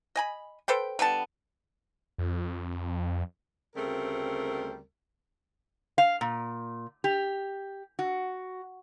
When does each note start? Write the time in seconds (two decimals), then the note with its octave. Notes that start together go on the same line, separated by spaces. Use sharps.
0.16 D#5 G#5 B5
0.68 A4 B4 C5 G5
0.99 D3 G3 B3 A5
2.18 F2
3.76 D2 C#3 G3 A3 C4 A#4
5.98 F5
6.21 A#2
7.04 G4
7.99 F#4